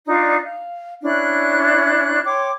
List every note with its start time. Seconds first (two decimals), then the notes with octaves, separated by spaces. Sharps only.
0.07 D4 D#4 F4 D5
0.42 F5
1.02 C#4 D4 E4 F#6
2.24 C#5 G5 C6 D6